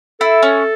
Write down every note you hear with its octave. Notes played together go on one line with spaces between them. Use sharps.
E4 A4
C#4